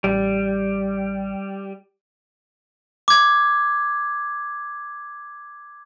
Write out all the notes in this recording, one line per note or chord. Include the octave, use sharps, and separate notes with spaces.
A1 G3
D6 G#6